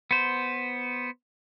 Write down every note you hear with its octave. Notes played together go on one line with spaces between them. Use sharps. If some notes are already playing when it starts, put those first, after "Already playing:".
B3 C5